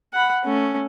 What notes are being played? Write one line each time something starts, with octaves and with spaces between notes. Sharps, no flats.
F#5 B5
A3 C#4